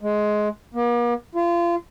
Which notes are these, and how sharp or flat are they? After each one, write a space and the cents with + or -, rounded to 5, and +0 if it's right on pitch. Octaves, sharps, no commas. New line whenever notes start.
G#3 +15
A#3 +45
F4 -30